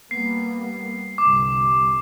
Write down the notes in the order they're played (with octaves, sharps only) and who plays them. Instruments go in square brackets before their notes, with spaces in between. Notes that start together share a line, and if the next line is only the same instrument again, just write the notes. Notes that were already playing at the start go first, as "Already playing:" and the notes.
[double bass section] G3 A#3 B3 [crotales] C7
[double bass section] G1 C2 G3 [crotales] D6